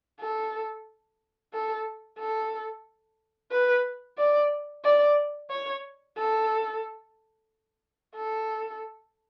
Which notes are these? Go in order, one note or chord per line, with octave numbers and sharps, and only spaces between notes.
A4
A4
A4
B4
D5
D5
C#5
A4
A4